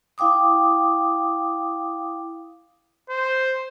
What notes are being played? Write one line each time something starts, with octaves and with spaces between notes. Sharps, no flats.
E4 F5 G5 D6 D#6
C5